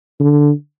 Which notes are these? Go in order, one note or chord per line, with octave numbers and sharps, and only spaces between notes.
D3